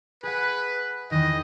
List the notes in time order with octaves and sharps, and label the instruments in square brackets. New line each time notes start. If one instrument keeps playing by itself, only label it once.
[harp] G#4 F#5 [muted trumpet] B4
[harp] E2 D#3 [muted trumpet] D#5